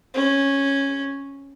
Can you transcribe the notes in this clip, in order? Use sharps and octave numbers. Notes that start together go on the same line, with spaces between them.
C#4